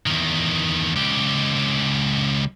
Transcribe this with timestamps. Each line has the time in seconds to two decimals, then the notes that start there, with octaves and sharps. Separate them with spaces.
0.06 E2 D#3
0.96 C#2 G4